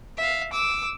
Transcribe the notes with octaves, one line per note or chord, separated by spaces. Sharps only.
E5 F5
D6 E6